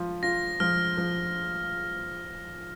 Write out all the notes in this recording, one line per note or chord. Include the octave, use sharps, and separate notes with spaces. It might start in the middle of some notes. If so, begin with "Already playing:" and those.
Already playing: F3 F4
F4 A#6
F3 F6
F3